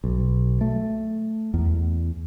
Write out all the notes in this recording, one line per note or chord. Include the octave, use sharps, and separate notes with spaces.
B1
A3
E2